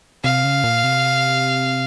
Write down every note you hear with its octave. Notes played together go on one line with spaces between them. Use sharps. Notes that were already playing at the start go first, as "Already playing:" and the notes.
C3 F5
C#3
A#2
C3